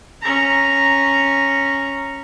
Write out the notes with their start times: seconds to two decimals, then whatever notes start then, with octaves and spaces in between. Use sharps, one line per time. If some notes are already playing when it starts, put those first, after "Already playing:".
0.22 C#4 A#5